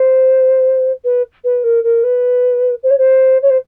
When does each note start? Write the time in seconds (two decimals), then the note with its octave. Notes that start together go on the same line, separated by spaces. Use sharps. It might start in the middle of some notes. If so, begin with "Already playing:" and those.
Already playing: C5
1.04 B4
1.44 B4
1.64 A#4
1.84 A#4
2.04 B4
2.83 C5
2.90 C#5
2.98 C5
3.42 C#5
3.50 C5